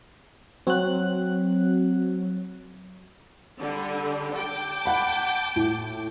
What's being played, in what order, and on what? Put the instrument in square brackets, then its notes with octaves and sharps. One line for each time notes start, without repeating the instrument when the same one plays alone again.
[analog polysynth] F#3 [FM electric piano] C4 F#6
[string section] D3 G3
G5 A5 D6
[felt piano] F#5 B5
A2